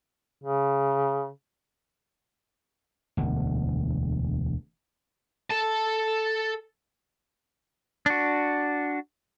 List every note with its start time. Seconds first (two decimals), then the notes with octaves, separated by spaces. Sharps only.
0.44 C#3
3.17 E1 D2
5.51 A4 A5
8.06 D4 F#4